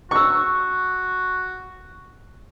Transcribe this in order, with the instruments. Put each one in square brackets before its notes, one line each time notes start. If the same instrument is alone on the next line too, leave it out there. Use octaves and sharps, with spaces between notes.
[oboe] F#4 [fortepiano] C#6 E6